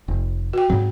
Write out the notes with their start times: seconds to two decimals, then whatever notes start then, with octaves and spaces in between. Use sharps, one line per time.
0.08 F1
0.53 F#4 G5
0.70 G#2 F#3 C4